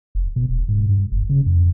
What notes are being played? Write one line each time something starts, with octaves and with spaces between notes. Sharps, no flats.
F1
B2
D#1
G#2
G2
F#1
C#3
F2